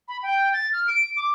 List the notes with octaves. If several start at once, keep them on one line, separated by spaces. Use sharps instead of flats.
B5
G5
A6
F6
D7
D6